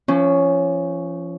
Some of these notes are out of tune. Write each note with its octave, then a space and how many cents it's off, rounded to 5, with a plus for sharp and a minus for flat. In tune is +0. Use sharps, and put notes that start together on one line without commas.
F3 -30 C#4 +0